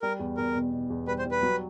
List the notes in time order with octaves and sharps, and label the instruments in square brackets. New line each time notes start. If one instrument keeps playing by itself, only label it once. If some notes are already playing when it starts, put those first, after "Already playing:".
[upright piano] G3 [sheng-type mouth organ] A#4
[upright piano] E2
[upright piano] E2 [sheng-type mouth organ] A#4
[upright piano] B2
B2
E2
[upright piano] G3 [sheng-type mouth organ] B4
[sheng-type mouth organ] C5
[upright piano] G3
[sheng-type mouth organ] B4
[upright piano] F#3